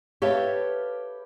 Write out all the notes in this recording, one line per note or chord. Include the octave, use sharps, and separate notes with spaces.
G4 A4 B4 C#5 E5 F5